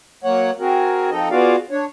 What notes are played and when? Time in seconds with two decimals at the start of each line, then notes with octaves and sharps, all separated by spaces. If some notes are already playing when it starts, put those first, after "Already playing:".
0.24 F#3 A#3 C#5 F#5
0.60 C4 F#4 G#4 A#4
1.11 F3 C4 D#4 A4 D#5
1.31 B3 F4 F#4 G#4 D5 F5
1.70 D4 C#5